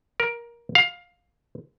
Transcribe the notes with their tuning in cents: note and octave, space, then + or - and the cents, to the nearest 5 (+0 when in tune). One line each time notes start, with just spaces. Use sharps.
A#4 +15
F5 +15